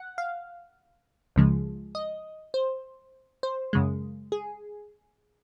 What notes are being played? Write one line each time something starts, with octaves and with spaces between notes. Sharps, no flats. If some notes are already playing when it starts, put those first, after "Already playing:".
Already playing: F#5
F5
C#2 C#3 F3 G#3
D#5
C5
C5
F#2 C#3 G#3
G#4